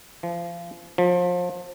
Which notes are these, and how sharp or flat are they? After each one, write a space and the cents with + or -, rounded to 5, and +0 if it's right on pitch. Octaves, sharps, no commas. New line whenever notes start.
F3 -30
F3 +30